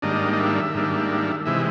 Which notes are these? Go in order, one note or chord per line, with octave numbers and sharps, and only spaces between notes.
G#2 D#3 G3 A#3 D4 D#5
D#5
E5
G#2 D#3 G3 A#3 D4
C3 E3 G#3 E5